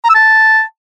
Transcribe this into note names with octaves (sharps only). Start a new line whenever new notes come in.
A#5
E6
A5